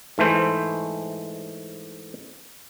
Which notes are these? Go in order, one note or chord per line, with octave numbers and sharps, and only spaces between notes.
G#2 E3 A3 C5